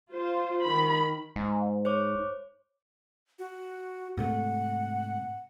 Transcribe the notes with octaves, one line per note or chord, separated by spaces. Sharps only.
F4 C5
D#3 B5
G#2
C5 C#5 D6
F#4
G#2 C3 A3 F#5